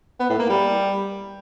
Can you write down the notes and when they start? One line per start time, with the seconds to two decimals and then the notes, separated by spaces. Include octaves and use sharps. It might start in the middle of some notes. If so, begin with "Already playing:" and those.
0.20 B3
0.30 A2
0.39 A#3
0.49 G3